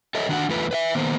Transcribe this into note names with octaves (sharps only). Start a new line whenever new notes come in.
A4 C#5 D#5 E5
D#3 D4 F#4 F5 F#5
E2 A3 F4 B4
B4 D#5 E5
D#3 A#3 B3 C5